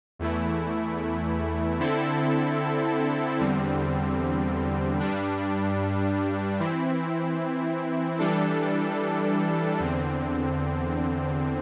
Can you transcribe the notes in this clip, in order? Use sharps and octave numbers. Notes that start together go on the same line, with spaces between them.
E2 E3 A3 E4
D3 C4 E4 A4
E2 D3 G3 C4
G2 G3 D4
E3 C4 E4
E3 G3 D4 A4
E2 D3 C4